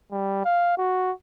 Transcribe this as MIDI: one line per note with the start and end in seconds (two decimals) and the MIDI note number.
0.12 0.43 55
0.45 0.76 77
0.78 1.11 66